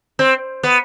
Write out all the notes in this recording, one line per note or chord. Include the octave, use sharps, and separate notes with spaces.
C4
B3